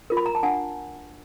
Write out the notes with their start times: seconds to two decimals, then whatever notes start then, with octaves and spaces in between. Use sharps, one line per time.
0.10 F4 A#4
0.17 B5
0.26 A#5
0.35 A5
0.43 D4 F#5 G#5